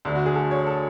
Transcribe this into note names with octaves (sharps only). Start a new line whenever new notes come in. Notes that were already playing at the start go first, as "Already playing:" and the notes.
D2 D3 D4
F#4
G#4
A4
C#5
A4